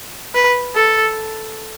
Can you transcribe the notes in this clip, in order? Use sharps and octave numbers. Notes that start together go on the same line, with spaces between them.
B4
A4